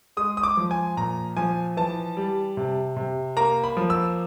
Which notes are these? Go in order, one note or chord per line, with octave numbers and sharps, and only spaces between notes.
G#3 D#6
D#6
D6
F3
G#5
A#2 A#5
F3 G#5
E3 A5
G3
C3
C3
A#3 A#5
B5
F3
E6